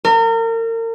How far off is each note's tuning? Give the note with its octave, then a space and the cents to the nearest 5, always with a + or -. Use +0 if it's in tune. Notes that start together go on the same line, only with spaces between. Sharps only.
A#4 -35